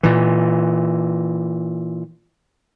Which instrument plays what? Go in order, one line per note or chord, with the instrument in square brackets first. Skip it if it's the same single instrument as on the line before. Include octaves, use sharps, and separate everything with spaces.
[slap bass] A#2 E3